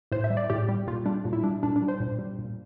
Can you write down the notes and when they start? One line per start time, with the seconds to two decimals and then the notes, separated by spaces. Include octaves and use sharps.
0.12 A2 C5
0.24 E5
0.30 G3
0.37 D5
0.50 A2 G4
0.69 G3
0.87 A#2 F4
1.06 G3 D4
1.25 A#2
1.33 E4
1.43 G3 D4
1.63 A#2 D4
1.76 D4
1.82 G3
1.88 C5
2.00 A#2
2.19 G3
2.38 A#2